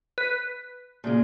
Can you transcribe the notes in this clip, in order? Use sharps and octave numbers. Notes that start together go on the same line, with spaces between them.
B4
A#2 C#3 G#3